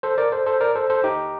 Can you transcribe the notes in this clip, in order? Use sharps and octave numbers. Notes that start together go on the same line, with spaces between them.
A4 C5
A#4 D5
A4 C5
A4 C5
A#4 D5
A4 C5
A4 C5
D#4 G4